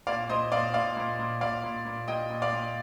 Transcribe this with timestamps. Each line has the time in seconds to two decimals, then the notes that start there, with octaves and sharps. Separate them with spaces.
0.07 A#2 D5 F5
0.29 A#2 C5 D#5
0.52 A#2 D5 F5
0.74 A#2 D5 F5
0.97 A#2
1.19 A#2
1.41 A#2 D5 F5
1.64 A#2
1.85 A#2
2.08 A#2 D#5 G5
2.31 A#2
2.42 D5 F5
2.53 A#2